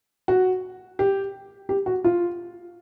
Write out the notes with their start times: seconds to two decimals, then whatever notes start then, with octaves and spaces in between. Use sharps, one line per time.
0.28 F#4
0.99 G4
1.69 G4
1.86 F#4
2.04 F4